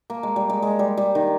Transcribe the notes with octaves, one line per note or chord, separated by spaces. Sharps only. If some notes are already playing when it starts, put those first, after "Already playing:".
A#3
G#3
G3
G#3
G#3
G3
G3
D#3